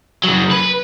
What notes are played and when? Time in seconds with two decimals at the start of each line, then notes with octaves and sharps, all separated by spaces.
0.24 C#3 F#3
0.52 B4